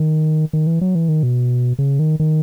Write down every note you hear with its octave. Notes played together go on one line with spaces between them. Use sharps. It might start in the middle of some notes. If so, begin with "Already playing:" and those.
Already playing: D#3
D#3
E3
F#3
E3
D#3
B2
C#3
D#3
D#3